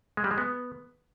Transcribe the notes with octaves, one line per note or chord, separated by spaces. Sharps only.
G#3
G3
G#3
B3